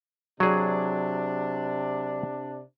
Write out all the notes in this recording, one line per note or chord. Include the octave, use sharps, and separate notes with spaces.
C3 F#3 D4 G#4